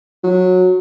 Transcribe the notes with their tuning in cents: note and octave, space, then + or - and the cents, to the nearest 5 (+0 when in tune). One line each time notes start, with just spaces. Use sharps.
F#3 -15